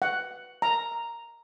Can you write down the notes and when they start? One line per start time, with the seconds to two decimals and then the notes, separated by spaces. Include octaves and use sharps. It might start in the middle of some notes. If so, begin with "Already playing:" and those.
0.02 F#5
0.62 A#5